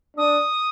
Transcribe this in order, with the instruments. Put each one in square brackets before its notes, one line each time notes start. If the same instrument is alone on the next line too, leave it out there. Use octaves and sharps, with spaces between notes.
[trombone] D4 [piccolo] D#6